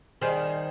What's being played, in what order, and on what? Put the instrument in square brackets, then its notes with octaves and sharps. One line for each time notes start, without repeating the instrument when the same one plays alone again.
[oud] D#3 G3 [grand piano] G#4 C5